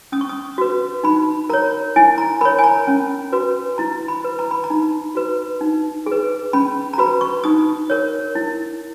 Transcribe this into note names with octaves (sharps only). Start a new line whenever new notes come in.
C#4 D#6
C#6
D#6
F#4 B4
D#4 B5
A#4 C#5 A#5
E4 G#5
A#5
A#4 C#5 B5
G#5
A#5
C#4
F#4 B4
E4 A#5
B5
B4
A#5
B5
A#5
D#4
F#4 B4
D#4
G#4
B4
C#4 B5
A#5
F#4 B4 B5
C#6
D#4 D#6
A#4 C#5
E4